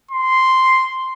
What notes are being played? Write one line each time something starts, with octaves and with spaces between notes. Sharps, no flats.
C6